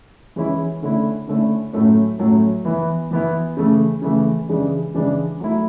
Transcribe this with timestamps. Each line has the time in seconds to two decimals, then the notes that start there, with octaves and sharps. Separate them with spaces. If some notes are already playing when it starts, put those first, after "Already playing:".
0.36 E3 G#3 C#4 E4
0.82 D3 A3 C#4 E4
1.27 D3 A3 C#4 E4
1.73 A2 F#3 A3 C#4
2.19 A2 F#3 A3 C#4
2.65 E3 B3 E4
3.11 E3 B3 E4
3.57 C#3 E3 A3
4.02 C#3 E3 A3
4.49 C#3 E3 G#3 D4
4.94 C#3 E3 G#3 D4
5.40 F#3 A3 E4